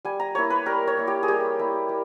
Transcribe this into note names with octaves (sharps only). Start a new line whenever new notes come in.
G3 G#5
A#5
A#3 E4 C#5
B4
G3 A#4
C#5
A#3 E4
G4
G#4
G3 G4
A#3 E4
G3